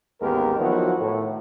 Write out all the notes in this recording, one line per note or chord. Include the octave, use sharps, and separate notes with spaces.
A1 D#2 G#3 B3 G4 A#4
D#3 F3 F#3 B3 E4 F#4
A2